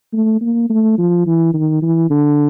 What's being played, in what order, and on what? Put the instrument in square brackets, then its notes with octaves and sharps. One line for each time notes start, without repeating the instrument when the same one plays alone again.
[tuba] A3
A#3
A3
F3
E3
D#3
E3
D3